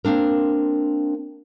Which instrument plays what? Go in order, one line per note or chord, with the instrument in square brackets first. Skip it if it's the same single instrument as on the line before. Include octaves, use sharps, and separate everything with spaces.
[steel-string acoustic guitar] A#3 C4 D4 A#4